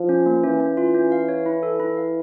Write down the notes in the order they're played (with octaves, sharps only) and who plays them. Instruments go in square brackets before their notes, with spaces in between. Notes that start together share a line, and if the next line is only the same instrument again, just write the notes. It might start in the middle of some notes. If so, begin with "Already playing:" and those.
Already playing: [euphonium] F3
[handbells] C#4
A#3
[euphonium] E3 [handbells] C#4
[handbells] C#4
F4
C#4
F5
C#5
E4
A4
E4
F5